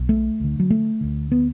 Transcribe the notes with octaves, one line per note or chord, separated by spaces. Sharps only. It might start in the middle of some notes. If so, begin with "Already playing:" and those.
Already playing: B1 B2
A3
D2 D3
F#3
A3
D2 D3
B3